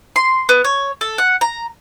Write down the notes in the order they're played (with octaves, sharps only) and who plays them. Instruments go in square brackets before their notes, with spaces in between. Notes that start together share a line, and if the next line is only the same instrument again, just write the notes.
[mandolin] C6
B3
C#5
A4
F#5
A#5